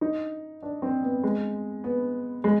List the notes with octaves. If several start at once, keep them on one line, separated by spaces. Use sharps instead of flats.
D#4
D4
C4
B3
G#3
B3
G#3